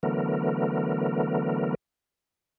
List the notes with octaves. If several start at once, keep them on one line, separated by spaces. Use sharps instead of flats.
D3 E3 F#3 A3 B3 A#4